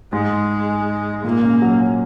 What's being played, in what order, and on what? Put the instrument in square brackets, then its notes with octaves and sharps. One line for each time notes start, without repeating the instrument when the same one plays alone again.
[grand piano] G#2 [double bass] G#3
[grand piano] A#2 [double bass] A#3
[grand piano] C#3
F#3
C#4